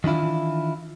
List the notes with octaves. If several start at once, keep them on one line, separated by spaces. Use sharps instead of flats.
D#3 E3 D4 E4 F4